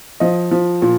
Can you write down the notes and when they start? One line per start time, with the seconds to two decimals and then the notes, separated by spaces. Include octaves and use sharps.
0.20 F3 D#5
0.51 F3
0.82 A#2